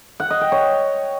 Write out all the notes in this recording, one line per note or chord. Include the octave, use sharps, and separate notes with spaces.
F#5
D#5
G5
C#5